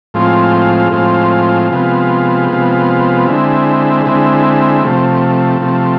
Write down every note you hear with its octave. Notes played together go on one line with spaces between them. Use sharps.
A2 F3 G#3 C4 F4
A2 F3 G#3 C4 F4
C3 F3 G#3 B3 F4
C3 F3 G#3 B3 F4
D3 G#3 C4 E4
D3 G#3 C4 E4
C3 F3 A3
C3 F3 A3